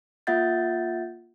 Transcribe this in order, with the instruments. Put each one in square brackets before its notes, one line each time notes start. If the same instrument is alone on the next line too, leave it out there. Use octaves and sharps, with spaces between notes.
[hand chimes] A#3 F4 E5 F#5 G6 A6